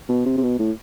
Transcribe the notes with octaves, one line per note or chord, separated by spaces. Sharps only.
B2
C3
C3
B2
A2